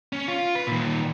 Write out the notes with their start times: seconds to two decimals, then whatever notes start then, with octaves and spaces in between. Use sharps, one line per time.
0.13 C#4
0.28 F4
0.55 B4
0.67 A#2 D#3